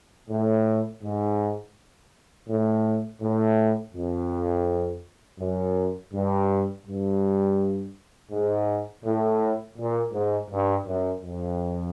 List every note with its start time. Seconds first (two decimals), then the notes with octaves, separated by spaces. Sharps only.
0.30 A2
1.04 G#2
2.49 A2
3.22 A2
3.95 F2
5.40 F#2
6.13 G2
6.86 G2
8.32 G#2
9.05 A2
9.78 A#2
10.14 G#2
10.51 G2
10.87 F#2
11.23 F2